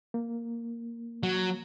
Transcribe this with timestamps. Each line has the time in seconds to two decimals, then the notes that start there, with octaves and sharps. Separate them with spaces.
0.14 A#3
1.23 F#3